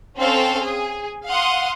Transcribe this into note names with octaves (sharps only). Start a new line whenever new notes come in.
C4 C#4 A4 F5 G5
G#4
F5 F#5 C6 D#6